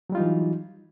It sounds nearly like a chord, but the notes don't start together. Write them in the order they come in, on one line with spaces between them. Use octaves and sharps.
F#3 G3 F4 D#4 E3